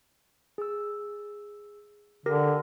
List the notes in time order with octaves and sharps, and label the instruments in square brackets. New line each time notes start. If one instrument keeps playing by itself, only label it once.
[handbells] G#4 E6
[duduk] D3 [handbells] G4 A#4 A#6